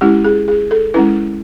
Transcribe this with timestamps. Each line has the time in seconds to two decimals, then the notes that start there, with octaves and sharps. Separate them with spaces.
0.01 G#3 C#4 E4 G4
0.24 G#4
0.48 G#4
0.71 A4
0.94 G#3 C#4 E4 B4